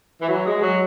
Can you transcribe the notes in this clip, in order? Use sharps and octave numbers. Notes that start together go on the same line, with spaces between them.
E3
F#3
G#3
F#3